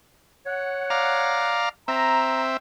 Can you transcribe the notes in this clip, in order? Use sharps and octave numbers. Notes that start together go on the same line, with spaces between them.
C#5 F#5
D5 F5 A#5
C4 E5 A#5